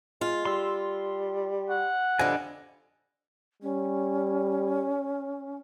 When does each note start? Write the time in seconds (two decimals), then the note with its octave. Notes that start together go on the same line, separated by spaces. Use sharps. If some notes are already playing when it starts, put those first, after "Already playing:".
0.21 G#3 F4
0.45 G3 C6 E6
1.70 F#5
2.19 D3 F3 G3 D4 D#5 G#5
3.62 G3 C#4